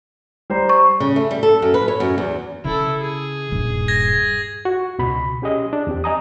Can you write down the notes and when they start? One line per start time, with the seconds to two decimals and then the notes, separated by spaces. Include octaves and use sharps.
0.50 G3 C5 A#5
0.69 C#6
1.00 C#3
1.16 A3
1.31 G3
1.43 A4
1.62 F#2
1.74 B4
1.88 C#5
2.00 F#2
2.18 E2
2.64 C#3 E4 A4
3.01 G#4
3.51 D#1 G2
3.88 G#6 A#6
4.65 F#4
4.99 C#2 B2 B5
5.42 C#4 G4 G#4 D#5
5.73 D4
5.87 E2 C4 G4
6.04 D#5 G#5 A#5 D#6